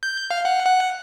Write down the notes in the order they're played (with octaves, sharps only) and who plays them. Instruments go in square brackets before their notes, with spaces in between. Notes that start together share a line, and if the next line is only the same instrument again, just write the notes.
[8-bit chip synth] G6
F5
F#5
F#5